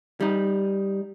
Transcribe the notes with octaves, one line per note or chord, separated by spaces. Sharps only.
G3 D#4